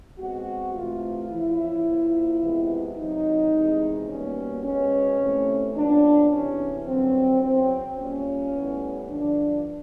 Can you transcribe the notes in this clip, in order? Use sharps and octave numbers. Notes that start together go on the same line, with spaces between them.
B2 G#3 C4 F#4
C3 E3 A3 F4
E2 C#3 F3 E4
A#2 F3 A#3
F2 C3 E3 G#3 B3
C3 D#3 F#3 D#4
E2 C3 D#3 G#3
B2 G3 A#3 C#4
B2 G#3 B3 C#4
C3 E3 A3
A#2 F#3 B3 D4
E2 C3 E3 C#4
G2 D3 F#3 C4
E2 C#3 F#3 C4
A#2 G3 A#3 C#4
A2 E3 G3 B3
G2 D3 F3 D4